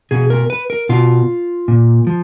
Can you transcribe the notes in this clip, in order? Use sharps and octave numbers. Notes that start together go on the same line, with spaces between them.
B2 G#4
A#4
B4
A#4
B2 F4
A#2
F3